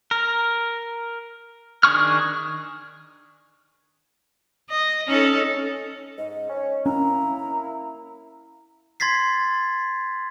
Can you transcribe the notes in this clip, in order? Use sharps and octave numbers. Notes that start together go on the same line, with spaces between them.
A#4
D#3 D4 G#4 C#6 F6
D#5
C#4 D#4 A4
G#2 D#5
C#4
A#3 C#4 E4 A#5
C6 G#6 A6 B6 C7